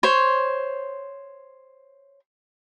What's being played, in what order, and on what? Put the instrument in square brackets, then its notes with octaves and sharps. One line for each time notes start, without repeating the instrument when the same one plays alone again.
[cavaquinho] C5 C#5